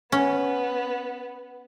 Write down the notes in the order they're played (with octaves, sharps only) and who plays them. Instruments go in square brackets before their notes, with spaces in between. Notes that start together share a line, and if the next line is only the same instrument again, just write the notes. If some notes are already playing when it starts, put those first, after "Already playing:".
[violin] B3 [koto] C#4